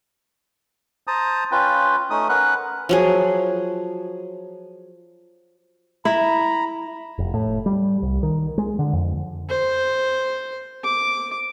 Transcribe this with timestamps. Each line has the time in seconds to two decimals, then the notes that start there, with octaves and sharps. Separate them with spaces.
1.07 C5 A5 A#5 D#6
1.52 C#4 F4 B4 G5
2.10 A3 C#4 D#4 D#6
2.29 C#4 A#4 B4 F#5 F#6
2.89 F3 F#3 G#4
6.05 E4 E5 A#5 B5
7.18 F1
7.34 A2
7.66 G3
8.02 C2
8.23 D#3
8.58 G#3
8.79 D3
8.93 F2
9.49 C5
10.84 D6